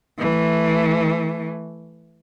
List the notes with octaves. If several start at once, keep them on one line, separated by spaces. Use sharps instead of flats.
E3 A3